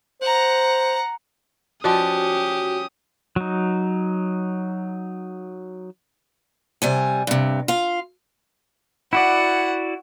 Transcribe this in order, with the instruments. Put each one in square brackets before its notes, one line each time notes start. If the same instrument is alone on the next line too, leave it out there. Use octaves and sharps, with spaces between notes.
[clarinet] C5 [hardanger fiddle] F#5 A#5
[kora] F3 D5 D#5 [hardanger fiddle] C#4 G4 [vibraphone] F#4 [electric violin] D#6
[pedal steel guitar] F#3 D#4
[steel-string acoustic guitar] C3 G3 G#5
G2 C3
F4 F5
[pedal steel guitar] E4 F#4 D5 [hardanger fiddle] F#5